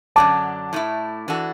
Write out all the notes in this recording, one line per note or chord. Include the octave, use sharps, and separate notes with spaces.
F#2 D3 F#3 D4 A5 D6
A2 A3 E4
E3 D4 F#4 A4